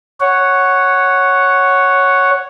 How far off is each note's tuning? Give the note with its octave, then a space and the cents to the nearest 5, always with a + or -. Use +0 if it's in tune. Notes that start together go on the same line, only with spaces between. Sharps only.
C#5 +0 F#5 +0